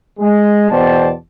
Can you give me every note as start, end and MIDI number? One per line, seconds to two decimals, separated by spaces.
0.19 0.69 56
0.70 1.11 40
0.70 1.11 47
0.70 1.11 72
0.70 1.11 74
0.70 1.11 79
0.70 1.11 81